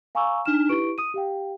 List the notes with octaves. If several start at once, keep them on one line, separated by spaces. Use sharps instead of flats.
F5 G#5 A#5 C#6 D6 E6
D4 D#4 G#5 F6 E7
E4 G4 B4 C#6 D7
D#6 D#7
G4 F5 G5